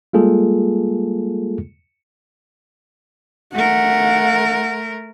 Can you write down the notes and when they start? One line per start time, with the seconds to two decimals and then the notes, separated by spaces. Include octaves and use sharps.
0.13 G3 G#3 A#3 F4 G#4 A4
3.54 A3 A#4 F#5